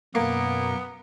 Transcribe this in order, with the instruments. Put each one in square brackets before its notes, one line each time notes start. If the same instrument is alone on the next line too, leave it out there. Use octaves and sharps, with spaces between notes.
[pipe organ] F#2 B2 [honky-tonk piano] A#3 [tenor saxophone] B3